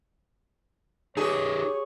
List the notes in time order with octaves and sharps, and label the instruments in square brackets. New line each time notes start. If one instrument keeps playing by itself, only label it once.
[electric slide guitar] D#4 A#4 B4 [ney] G4 [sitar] G#4 [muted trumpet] C#5